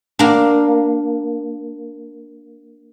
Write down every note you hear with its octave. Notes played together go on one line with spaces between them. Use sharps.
A#3 D4